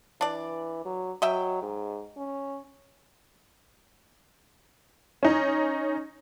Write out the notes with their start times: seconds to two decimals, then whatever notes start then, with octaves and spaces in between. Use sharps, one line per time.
0.21 E3 D4 D5
0.85 F#3
1.22 F#3 D#5 E5 G5
1.62 G#2
2.17 C#4
5.23 C#4 D#4